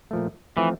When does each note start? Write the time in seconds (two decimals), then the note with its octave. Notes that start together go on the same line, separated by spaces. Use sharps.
0.11 A#2 F3 A3
0.57 E3 F3 A3 C4